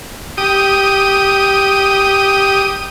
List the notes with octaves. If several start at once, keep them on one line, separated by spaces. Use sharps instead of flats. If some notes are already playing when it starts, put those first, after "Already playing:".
G4 D#6